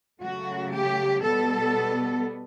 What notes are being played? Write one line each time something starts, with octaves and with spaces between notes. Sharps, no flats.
C#3 F#3 A3 F#4
G4
B2 G3 B3 A4